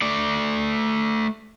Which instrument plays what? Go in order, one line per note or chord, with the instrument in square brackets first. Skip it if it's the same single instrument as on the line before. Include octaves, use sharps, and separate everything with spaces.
[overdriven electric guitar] A3 D5